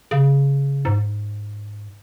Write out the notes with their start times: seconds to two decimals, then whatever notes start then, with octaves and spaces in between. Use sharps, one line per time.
0.11 C#3
0.85 G#2